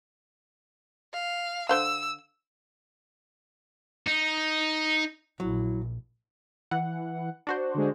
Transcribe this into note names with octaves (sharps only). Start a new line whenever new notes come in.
F5
D3 C5 F5 E6
D#4
A#1 F#3 E4
E3 F#5
D4 F#4 C5
D3 G#3